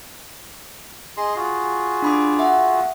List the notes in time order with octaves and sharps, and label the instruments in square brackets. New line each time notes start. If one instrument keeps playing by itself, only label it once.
[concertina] G#4 D#5 C6
F4 F#4 G#4
[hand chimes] D4 B5 D6
E5 F#5